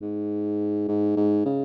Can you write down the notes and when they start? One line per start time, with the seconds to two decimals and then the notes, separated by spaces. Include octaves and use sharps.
0.01 G#2
0.88 G#2
1.16 G#2
1.45 C#3